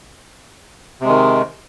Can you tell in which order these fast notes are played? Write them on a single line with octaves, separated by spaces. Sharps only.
C3 G#3 D#3